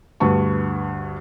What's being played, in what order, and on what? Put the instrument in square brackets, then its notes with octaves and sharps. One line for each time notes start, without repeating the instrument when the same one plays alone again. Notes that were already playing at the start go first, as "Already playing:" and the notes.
[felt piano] D2 G2 B4 A5 C#6